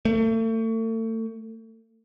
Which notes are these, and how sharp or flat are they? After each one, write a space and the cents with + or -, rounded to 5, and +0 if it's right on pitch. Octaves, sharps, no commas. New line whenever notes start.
A3 +35